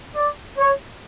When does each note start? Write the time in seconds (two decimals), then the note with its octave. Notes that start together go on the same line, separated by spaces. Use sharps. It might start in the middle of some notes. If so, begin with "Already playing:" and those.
0.16 D5
0.58 C#5